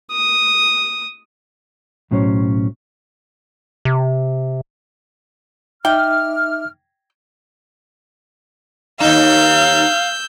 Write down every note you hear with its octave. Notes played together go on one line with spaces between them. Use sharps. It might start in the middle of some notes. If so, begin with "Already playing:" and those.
D#6
B1 A2 F#3 C#4 C5 C#5
C3
D#4 E5 G5 D6 F6
D#2 D#4 F5 E6 G6